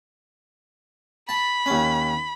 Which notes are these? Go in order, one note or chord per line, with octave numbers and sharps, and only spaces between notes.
A5 B5
D#2 C#4